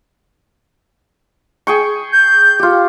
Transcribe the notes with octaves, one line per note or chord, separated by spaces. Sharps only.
G#4 G5 C#6
G6
F4 G4